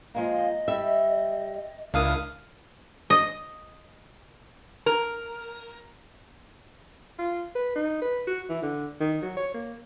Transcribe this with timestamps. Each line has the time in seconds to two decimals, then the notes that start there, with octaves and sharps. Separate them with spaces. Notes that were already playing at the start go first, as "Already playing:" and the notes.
0.15 F3 G#3 A#3 D#5
0.68 G3 E5
1.94 C#2 D4 E4 A#4 F5 D#6
3.10 D#5
4.86 A#4
7.18 F4
7.55 B4
7.76 D#4
8.02 B4
8.27 F#4
8.49 E3
8.63 D3
9.00 D#3
9.22 F#3
9.37 C#5
9.54 A#3